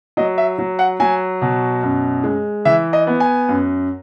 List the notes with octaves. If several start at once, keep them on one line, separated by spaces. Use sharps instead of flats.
F#3 D#5
E5
F#3
F#5
F#3 G#5
B2
F#2
G#3
E3 E5
D#5
B3
G#5
F#2